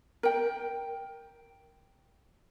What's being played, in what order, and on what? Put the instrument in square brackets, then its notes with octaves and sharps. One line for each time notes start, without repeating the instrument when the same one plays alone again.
[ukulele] A#4 G5